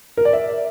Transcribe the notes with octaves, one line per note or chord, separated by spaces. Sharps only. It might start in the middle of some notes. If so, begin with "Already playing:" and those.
A#4
D5
E5